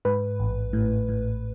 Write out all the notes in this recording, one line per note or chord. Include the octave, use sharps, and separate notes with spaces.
G#2 B4
A1
A2
A2